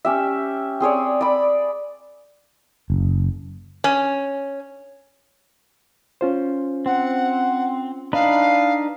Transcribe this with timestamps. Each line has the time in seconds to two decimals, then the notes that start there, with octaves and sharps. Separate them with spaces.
0.05 C#4 G4 E5
0.80 C4 G#4 C#5 D5
1.21 D5 B5
2.90 F#1
3.84 C#4
6.21 C#4 F4 C5
6.86 C4 F#5
8.13 D4 D#4 B4 F5